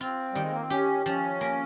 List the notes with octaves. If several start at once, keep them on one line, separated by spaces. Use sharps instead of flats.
C4 F4
D#3 G3
G#3
A#3
C4
C#4 G4
F3 C#4
A#3